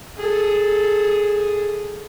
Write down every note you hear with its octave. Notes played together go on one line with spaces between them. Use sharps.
G#4 A4